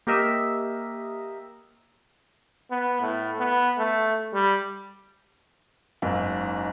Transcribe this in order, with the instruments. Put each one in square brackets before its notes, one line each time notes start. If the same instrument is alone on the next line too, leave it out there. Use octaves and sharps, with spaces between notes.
[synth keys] A#3 G4 A#4 D#5 E5
[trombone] B3
A2
B3
A3
G3
[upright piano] F#1 G#2